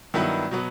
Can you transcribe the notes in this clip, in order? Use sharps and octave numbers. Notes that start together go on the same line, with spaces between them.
G2 D#3 F#3 B3 E4
B2 F#3 B3